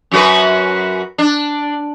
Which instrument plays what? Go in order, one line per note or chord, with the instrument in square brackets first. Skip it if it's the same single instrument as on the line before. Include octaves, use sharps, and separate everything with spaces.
[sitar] F#2 F#4 B4
D4